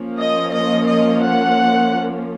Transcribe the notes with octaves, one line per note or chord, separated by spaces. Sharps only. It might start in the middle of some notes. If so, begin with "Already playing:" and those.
Already playing: F3 A#3 C#4
D#5
D#5
D#5
F#5